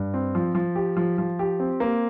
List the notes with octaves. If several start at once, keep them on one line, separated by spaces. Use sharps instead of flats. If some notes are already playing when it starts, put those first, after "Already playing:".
Already playing: G2
C4
F3
F3
G4
F3
F3
G4
C4
A#3